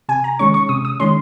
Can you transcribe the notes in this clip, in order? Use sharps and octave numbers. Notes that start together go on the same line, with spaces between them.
C3 G#5
A#5
D#3 G#3 C#4 C#6
C#6
C3 D#6
D#6
D#3 G#3 C#4 C6